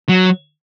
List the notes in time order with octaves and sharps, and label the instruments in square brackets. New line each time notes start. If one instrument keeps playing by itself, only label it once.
[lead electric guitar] F#3